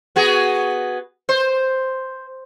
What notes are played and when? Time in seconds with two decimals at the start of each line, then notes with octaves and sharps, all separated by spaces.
0.16 B3 F#4 G#4
1.29 C5